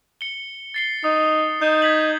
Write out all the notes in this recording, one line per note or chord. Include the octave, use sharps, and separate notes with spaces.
C#7 G7
A6 C7 G7
D#4 D#6
D#4 G6 E7
G#6 B6 F#7